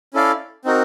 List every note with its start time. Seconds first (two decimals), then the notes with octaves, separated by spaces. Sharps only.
0.14 C#4 E4 A4 D5 F5
0.65 C4 D#4 F#4 A#4